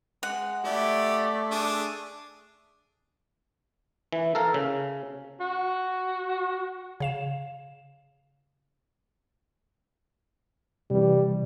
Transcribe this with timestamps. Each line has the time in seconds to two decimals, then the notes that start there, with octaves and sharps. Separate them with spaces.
0.23 G#3 F#5
0.64 A3 E4 G4 D5
1.51 D4 G#4
4.12 E3
4.35 A4 A#4 F5
4.54 C#3
5.40 F#4
7.00 C#3 F5 E7
10.90 C3 E3 G3